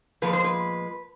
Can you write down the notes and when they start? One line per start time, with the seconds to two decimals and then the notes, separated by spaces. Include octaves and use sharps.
0.22 A#2 F3 G#3 B3 B4
0.33 C5
0.44 B4